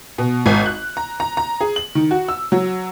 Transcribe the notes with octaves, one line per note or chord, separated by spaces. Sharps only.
B2
G#1
F#6
A#5
A#5
A#5
G#4
F#7
D#3
F#4
E6
F#3